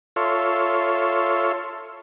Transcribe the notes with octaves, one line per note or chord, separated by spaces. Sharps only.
F4 A4 C#5 E5 C6